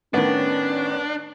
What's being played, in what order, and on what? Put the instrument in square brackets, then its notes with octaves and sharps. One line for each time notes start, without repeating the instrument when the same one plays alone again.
[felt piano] A2 D#3 [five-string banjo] B3 [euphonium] C#4 [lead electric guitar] D4